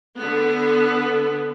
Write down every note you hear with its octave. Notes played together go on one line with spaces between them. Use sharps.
D3 B3